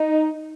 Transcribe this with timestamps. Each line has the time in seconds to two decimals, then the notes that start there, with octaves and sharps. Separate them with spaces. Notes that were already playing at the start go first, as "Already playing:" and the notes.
Already playing: D#4